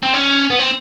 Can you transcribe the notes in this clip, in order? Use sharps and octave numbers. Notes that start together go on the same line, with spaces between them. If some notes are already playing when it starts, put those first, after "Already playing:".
C4
C#4
B3
C4